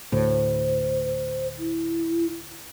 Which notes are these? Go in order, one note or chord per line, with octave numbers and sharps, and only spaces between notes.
D2 A2 C5
E4